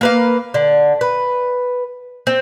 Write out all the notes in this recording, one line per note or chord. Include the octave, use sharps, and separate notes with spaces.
A#3 B4 F5
D3
B4
C4